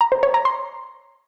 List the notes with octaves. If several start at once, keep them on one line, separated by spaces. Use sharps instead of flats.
A#5
C5
C#5
A#5
C6